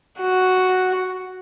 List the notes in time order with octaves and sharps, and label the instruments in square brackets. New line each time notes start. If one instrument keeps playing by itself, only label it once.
[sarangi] F#4